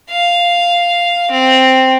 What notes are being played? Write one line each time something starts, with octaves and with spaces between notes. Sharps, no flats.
F5
C4